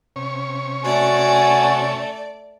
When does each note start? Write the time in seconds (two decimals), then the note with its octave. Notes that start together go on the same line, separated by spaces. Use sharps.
0.16 C3 C#4 C#5
0.84 A3 F#4 D5 G#5